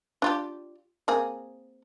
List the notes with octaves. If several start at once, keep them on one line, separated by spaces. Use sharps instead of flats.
D4 F4 G4
A#3 C4 G#4